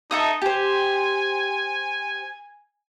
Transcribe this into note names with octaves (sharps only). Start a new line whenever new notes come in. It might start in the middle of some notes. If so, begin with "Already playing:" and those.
D#4 A4 E5 D#6
G4 C5 G#5